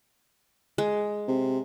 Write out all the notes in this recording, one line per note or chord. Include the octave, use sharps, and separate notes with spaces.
G#3
C3